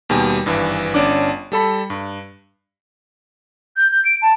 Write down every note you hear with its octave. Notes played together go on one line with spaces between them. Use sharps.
D#2 B2 G3 G4 G#5
G#1 G2 E3
G1 C#4 D4 D6
G3 A4 B5
G2
G6
G6
D7
A5